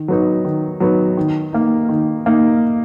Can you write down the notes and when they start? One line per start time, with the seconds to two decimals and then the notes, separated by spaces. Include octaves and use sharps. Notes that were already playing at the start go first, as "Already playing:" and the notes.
Already playing: D#3
0.08 F#3 B3 D#4
0.44 D#3
0.80 F#3 B3 D#4
1.17 D#3
1.53 A#3 D#4
1.89 D#3
2.26 A#3 D#4